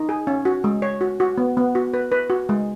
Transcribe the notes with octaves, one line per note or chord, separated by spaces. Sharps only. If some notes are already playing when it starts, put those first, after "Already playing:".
Already playing: D#4
G#4
C#4
F#4
G#3
C#5
F#4
F#4
B3
B3
F#4
B4
B4
F#4
G#3